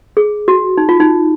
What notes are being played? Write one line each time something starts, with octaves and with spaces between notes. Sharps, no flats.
G#4
F#4
D#4
F4
D#4